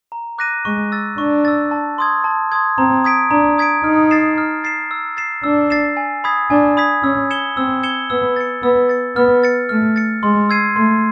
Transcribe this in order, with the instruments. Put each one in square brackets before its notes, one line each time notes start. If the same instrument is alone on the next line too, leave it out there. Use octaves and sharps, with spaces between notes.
[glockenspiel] A#5
D6 F#6 A#6 D#7
[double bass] G#3 [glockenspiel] C#6
[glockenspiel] E6 A6
[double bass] D4 [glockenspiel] C#6
[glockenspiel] E6 A6
A5
C6 D#6 G#6
A5
C6 D#6 G#6
[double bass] C4 [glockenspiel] A#5
[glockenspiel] D#6 G#6 B6 D7
[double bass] D4 [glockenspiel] A#5
[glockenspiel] D#6 G#6 B6 D7
[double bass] D#4 [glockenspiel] F6
[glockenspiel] A6 C7 E7
F6
A6 C7 E7
E6
A6 C7 E7
[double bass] D4 [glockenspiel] E6
[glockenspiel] A6 C7 E7
G#5
B5 D#6 G#6 B6
[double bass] D4 [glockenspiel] G#5
[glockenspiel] B5 D#6 G#6 B6
[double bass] C#4 [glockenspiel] E6
[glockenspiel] G#6 C#7 E7 G7
[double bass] C4 [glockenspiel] E6
[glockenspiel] G#6 C#7 E7 G7
[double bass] B3 [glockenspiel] E6
[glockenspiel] A6 C#7
[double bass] B3 [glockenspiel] E6
[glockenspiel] A6 C#7
[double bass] B3 [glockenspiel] F6
[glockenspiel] A6 C#7
[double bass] A3 [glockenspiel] F6
[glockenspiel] A6 C#7
[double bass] G#3 [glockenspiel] C6
[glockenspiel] E6 G#6 C7 D#7
[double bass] A3 [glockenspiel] C6